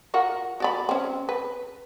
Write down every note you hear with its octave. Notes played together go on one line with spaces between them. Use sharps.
F4 F#4 A#4
F#4 D5 B5
C4 C#4
B4